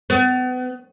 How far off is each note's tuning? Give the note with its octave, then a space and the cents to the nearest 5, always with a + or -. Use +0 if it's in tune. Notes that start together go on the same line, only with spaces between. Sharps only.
B3 +35